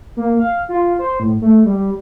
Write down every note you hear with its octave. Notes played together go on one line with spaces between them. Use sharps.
A#3
F5
F4
C5
A2
A3
G3